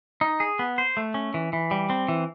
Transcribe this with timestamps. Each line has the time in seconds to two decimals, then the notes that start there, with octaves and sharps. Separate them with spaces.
0.21 D#4
0.40 G#4
0.59 B3
0.78 C5
0.97 A3
1.14 C#4
1.34 E3
1.53 E3
1.71 G3
1.90 C4
2.08 E3